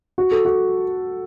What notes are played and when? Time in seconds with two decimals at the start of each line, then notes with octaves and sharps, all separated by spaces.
0.18 F#4
0.32 A4
0.45 F#4